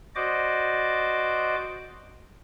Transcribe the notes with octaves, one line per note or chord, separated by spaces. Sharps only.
F#4 C5 D5 D#5 D6